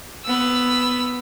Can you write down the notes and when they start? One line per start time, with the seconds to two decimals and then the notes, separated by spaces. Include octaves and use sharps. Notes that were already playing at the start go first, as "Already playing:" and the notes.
0.25 B3 E6